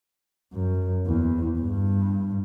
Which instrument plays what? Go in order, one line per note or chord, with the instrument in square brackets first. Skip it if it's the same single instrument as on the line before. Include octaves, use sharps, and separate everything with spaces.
[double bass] F#2
E2
G2